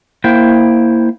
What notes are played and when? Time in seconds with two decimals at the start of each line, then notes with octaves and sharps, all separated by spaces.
0.24 A#3 E4 C5 G5